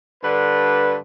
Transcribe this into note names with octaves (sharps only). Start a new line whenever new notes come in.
G2 D3 B4